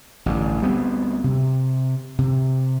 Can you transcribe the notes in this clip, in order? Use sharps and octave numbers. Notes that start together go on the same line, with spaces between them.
A1 G2 D3
D2 G3 B3 C4
C3
C3